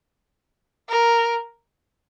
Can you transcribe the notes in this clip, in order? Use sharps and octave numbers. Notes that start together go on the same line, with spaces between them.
A#4